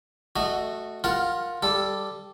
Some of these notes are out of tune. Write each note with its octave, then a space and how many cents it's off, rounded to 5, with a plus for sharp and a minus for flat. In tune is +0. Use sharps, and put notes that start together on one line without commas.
A3 +0 F#4 +0 D#5 -25
F4 +15 A#4 +0 F#5 +5
G3 +0 A4 +0